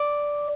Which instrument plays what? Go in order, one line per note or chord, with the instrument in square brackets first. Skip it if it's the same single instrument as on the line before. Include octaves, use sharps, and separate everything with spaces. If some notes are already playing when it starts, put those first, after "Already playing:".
Already playing: [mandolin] D5